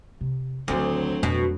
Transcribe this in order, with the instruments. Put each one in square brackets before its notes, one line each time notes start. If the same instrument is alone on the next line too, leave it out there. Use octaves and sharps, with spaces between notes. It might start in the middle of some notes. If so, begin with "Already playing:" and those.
[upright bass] C3
[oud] D2 [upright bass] D3 D#3 [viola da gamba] F#3 A3 C4
[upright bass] F2 [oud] B2